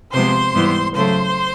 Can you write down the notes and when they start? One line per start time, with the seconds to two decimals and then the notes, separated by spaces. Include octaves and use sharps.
0.13 C3 F3 G#3 B3 C5 C6
0.54 G#2 E3 G3 B3
0.94 C#3 F#3 A3 C5 C6